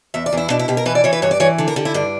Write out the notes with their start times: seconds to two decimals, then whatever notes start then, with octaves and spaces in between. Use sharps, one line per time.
0.14 E2 E5
0.26 D5
0.33 E2 E4
0.50 B2 D4
0.59 E4
0.68 B2 G4
0.77 A#4
0.86 E3 B4
0.95 D5
1.04 E3 C#5
1.13 B4
1.22 G2 C#5
1.31 D5
1.40 E3 C#5
1.58 D3
1.68 A#4
1.76 D3 G4
1.85 E4
1.94 G2 D4